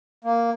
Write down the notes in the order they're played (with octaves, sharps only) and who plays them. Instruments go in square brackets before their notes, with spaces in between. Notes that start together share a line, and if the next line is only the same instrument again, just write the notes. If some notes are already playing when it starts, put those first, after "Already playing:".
[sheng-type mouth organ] A#3